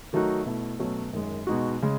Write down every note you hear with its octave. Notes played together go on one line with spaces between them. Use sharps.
D#3 F#3 A3 D#4 F#4
B2 A3 E4
B2 F#3 A3 C#4 F#4
F#2 D#3 G#3
B2 G#3 D#4 F#4
C#3 G#3